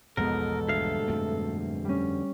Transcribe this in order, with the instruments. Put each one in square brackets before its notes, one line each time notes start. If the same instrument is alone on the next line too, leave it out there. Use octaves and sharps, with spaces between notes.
[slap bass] A1 E2 F3 [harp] G#2 B2 [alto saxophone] A4 [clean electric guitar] A#4
[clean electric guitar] D2 G2 F5 [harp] E5
[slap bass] F2 A3 C4
[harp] G3 C#4